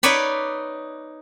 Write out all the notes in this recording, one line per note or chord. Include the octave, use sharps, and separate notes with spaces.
D#4 B4 C#5 D5 B5